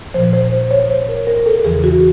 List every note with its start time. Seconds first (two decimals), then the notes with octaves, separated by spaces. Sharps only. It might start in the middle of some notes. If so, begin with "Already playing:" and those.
0.14 A#2 F3 C5
0.33 C5
0.52 C5
0.71 C#5
0.89 C5
1.09 A#4
1.27 A#4
1.46 A4
1.64 E2 C#3 E3 G#4
1.84 F#4